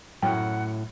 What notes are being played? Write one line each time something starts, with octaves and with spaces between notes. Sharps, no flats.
F#2 A2 F#5 G5